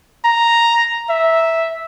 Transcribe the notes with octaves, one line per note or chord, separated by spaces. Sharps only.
A#5
E5